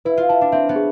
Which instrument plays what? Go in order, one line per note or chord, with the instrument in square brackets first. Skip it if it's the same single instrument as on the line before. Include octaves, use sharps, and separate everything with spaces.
[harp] E4 [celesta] B4
[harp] F4
[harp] E4 [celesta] A5
[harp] D4
[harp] C4 [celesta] E5
[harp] B3
[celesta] G#4